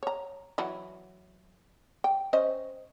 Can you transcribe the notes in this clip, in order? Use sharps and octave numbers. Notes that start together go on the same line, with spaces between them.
C#5 A#5
E3 F#3 E4
G5
C#4 C5 D#5